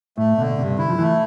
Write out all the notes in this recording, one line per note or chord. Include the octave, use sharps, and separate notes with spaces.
A2 A3
B2 D3
G2 C3
D3 E4
F3
E3 A3